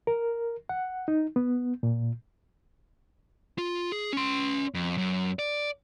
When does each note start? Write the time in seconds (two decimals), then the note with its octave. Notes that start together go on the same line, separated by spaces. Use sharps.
0.07 A#4
0.69 F#5
1.08 D#4
1.36 B3
1.83 A#2
3.58 F4
3.92 G#4
4.13 C#4 C6
4.74 F2
4.98 F#2
5.39 D5